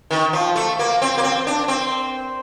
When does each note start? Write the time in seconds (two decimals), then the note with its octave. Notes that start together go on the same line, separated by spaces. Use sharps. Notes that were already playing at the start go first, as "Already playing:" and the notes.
0.11 D#3
0.33 F3
0.56 A3
0.79 A#3
1.02 C4
1.18 A#3
1.23 C4
1.47 D4
1.68 C4